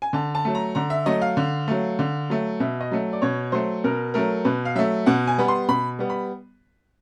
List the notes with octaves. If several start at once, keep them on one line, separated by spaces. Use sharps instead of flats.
G#5
D3 A5
A5
F#3 A3
A#5
D3 A#5
E5
F#3 A3 D#5
F5
D3
F#3 A3
D3
F#3 A3
B2 E5
D#5
F#3 A3
D5
B2 C#5
F#3 A3 C5
B2 A#4
F#3 A3 A#4
B2 B4
F5
F#3 A3 E5
B2 F#5
G#5
G3 B3 B5
C6
B2 B5
G3 B3
B5